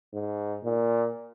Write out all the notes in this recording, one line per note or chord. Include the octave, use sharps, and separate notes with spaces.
G#2
A#2